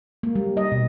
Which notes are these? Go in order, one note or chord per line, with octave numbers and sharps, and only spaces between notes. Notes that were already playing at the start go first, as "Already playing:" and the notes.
A#3
G3
D#5
B2